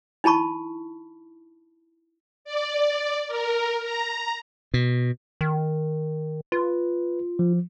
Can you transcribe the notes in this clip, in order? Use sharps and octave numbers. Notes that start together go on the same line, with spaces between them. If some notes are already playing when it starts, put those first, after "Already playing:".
D#4 E4 A5 B5 C#6
D5
A#4
A#5
B2
D#3
F4 B4
F3